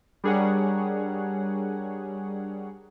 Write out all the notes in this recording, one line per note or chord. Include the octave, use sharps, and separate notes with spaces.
G3 D4 G#4 A#4 C#5 F#5